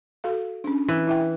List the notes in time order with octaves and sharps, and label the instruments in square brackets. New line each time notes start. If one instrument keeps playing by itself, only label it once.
[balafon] F#4 A4 F5
C#4 D4
[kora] E3
[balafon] E4 E5 G5